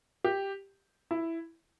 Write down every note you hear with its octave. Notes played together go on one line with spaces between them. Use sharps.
G4
E4